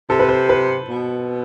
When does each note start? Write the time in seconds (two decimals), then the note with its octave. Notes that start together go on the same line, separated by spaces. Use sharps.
0.10 C3 A4
0.20 B4
0.29 C5
0.49 B4
0.89 B2